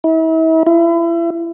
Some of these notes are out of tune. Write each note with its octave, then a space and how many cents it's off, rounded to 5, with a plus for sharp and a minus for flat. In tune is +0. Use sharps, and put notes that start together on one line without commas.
E4 -40
E4 +35